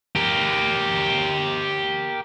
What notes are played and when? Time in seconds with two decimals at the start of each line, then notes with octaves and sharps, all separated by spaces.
0.16 G4 A#4